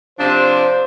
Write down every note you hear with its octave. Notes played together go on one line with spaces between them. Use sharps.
C3 F3 D4 C5